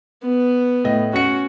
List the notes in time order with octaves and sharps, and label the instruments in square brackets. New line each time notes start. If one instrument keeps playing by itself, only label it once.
[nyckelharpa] B3
[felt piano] A2 D#5
[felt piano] C#4 C#7 [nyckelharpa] F#4